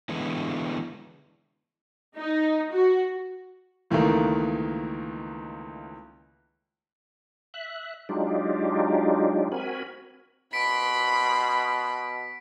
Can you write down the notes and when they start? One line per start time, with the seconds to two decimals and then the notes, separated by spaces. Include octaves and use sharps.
0.09 D3 E3 G#3 B3 E4
2.17 D#4
2.71 F#4
3.90 C#2 D#3 E3 A3 A#3
7.54 E5 F#6
8.09 F#3 G#3 D4 D#4 F4 G4
9.52 C4 F#4 A#4 G#5 B5
10.53 B2 B5 C6 B6 D7